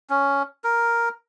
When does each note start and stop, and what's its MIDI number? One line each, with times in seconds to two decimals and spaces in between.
0.10 0.43 61
0.64 1.09 70